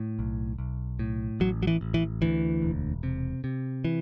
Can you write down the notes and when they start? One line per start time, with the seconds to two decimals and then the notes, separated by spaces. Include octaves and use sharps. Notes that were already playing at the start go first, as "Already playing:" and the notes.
Already playing: A2
0.19 B1
0.59 B1
0.99 A2
1.40 A1 F#3
1.63 F#3
1.67 E3
1.81 A1
1.94 E3
2.22 D2 E3
2.62 E1
3.03 C3
3.44 C3
3.85 E3